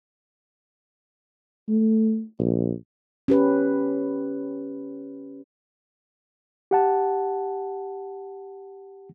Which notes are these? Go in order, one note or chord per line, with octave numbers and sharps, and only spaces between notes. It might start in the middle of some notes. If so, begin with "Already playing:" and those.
A3
A#1
C#4 G4 B4
G4 F#5 A5